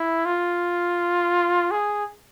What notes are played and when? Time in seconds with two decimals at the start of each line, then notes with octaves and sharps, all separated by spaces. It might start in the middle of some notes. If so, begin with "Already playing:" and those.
Already playing: E4
0.25 F4
1.71 G#4